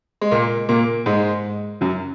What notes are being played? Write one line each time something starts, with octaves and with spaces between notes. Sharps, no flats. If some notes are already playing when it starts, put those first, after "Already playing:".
G#3
A#2 A#3
A#2 A#3
G#2 G#3
F#2 F#3